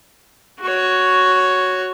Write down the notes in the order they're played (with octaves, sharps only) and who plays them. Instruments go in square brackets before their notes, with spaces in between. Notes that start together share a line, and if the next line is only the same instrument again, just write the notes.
[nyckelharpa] F#4 C#5